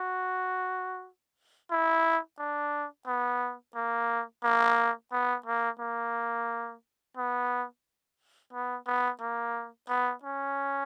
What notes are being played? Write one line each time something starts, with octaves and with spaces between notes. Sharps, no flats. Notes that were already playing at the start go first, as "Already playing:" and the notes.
Already playing: F#4
E4
D4
B3
A#3
A#3
B3
A#3
A#3
B3
B3
B3
A#3
B3
C#4